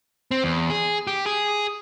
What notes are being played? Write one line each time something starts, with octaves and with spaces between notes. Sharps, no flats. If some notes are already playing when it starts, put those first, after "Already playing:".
C4
E2
G#4
G4
G#4